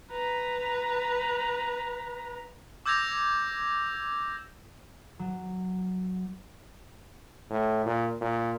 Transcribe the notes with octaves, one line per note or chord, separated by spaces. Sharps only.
B4 A#5
D6 E6 G6 G#6 A#6 F7
F#3
A2
A#2
A#2